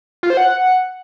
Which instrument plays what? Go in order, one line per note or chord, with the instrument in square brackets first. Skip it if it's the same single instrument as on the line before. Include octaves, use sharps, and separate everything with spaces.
[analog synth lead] F4
C5
F#5